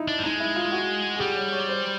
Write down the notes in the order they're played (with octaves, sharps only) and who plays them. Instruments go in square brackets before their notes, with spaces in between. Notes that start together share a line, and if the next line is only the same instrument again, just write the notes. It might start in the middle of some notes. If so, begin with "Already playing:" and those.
Already playing: [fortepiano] D#4 E4
[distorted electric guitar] D4
G3
[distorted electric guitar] G#3 [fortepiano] D#4
[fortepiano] E4
F4
F#4
G#4
[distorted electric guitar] G3 [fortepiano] G4
[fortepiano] C#5
C#5
C5